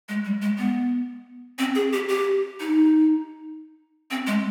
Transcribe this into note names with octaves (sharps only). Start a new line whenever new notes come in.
G#3
G3
G#3
B3
C4
G#4
G4
G4
D#4
C4
G#3